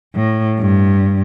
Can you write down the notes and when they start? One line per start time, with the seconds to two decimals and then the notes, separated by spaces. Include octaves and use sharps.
0.15 A2
0.60 G2